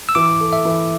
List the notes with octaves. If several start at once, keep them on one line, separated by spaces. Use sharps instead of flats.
E6
E3 D6
A4
E5
E3